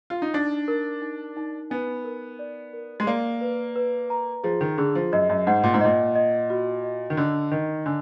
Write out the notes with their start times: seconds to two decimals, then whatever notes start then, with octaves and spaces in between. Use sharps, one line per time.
0.10 F4
0.22 D#4
0.34 D4 D#4
0.68 A#4
1.02 D#4
1.37 D#4
1.70 B3 G#5
2.04 A#4
2.39 D5
2.73 A#4
3.00 G#3
3.07 A#3 D5
3.41 B4
3.76 B4
4.10 A#5
4.44 F3 G#4
4.61 D#3
4.78 D3 G#4
4.95 F3
5.12 F#2 D#5
5.29 F#2
5.47 G#2 F#5
5.63 A#2
5.74 G#2
5.81 A#2 D#5
6.15 D#5
6.50 F#4
6.84 D#5
7.10 D#3
7.17 D3 D#5
7.51 D#3 D#5
7.86 D3 G#5